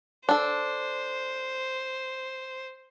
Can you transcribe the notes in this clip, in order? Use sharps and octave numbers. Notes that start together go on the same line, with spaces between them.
D4 A4 C5